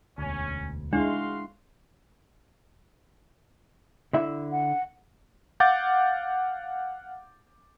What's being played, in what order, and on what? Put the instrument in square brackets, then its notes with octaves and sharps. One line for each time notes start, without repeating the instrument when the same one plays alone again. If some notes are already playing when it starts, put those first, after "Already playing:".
[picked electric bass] E1 D2 [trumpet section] C#4
[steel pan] G#3 E4 [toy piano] D4 [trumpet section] F#4 F5 C6
[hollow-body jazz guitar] D3 E4 E5
[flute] F#5
[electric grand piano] F5 F#5 D6 G6 A6